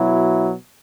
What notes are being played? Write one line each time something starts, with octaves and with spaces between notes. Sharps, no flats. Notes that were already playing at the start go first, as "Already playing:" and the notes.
Already playing: B2 F#3 E4